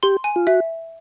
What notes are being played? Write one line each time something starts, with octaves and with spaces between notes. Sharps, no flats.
G4 C6
G#5
F4
F#4 E5